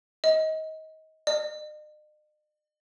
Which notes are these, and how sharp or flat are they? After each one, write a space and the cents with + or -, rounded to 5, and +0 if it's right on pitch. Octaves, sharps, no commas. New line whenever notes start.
D#5 +25
D#5 -45